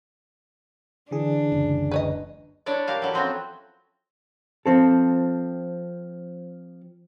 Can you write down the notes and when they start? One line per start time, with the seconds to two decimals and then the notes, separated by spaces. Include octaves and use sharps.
1.11 D3 E3 D4 G#4
1.52 F#1 C#2
1.91 B4 C#5 D#5
2.66 D4 E4 C#5 D5
2.88 A#3 G4 F5
3.02 F#3 E4 A4
3.14 F3 C4 C#4 F#4
4.66 F3 C4 A4